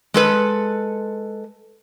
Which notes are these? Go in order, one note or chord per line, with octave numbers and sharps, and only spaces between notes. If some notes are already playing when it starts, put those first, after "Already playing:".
G#3 A4 B4